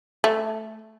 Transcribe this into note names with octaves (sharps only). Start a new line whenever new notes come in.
A3